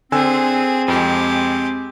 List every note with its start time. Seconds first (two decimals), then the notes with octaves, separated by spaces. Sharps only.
0.12 D3 C4 G#4 C5 G#5 E6
0.88 F2 G#3 G4